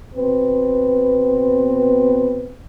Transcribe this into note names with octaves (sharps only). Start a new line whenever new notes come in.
B2 B3 C4 B4